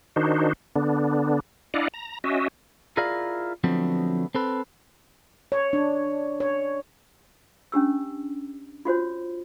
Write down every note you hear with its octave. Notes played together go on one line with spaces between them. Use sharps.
D#3 D4 D#4 F#4 C5
D3 B3 D4
D4 E4 D5 D#5 F5 F#5
A#5
C#4 F#4 D#5 E5
E4 F4 G#4 A#4 D5 F5
D3 F3 F#3 A3 B3 C4
C4 A4 B4
C#5
D4
C#5
C#4 D4 G4 E6
F4 F#4 C5 C#5